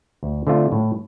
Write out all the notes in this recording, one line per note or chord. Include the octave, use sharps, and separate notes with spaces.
D2
D3 A3 C4 F4
A2